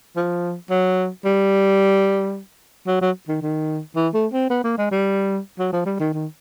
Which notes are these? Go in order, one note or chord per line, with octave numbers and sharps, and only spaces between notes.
F3
F#3
G3
F#3
F#3
D#3
D#3
E3
A3
C4
B3
A#3
G#3
G3
F#3
F3
G3
D#3
D#3